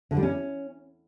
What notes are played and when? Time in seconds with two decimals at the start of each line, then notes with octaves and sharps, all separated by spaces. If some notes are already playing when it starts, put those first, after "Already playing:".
0.11 D3
0.17 G3
0.23 C#4